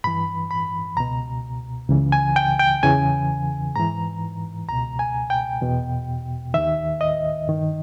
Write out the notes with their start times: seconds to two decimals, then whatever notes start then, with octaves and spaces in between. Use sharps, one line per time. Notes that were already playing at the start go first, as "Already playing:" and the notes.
0.04 G2 E3 B5
0.51 B5
0.97 C#2 B2 A#5
1.90 C#2 C#3 E3
2.12 G#5
2.36 G5
2.59 G5
2.83 E2 C#3 E3 G#5
3.76 G#2 E3 A#5
4.68 C#2 B2 A#5
4.99 G#5
5.30 G5
5.61 E2 B2
6.54 D#2 D#3 E5
7.01 D#5
7.48 G2 D#3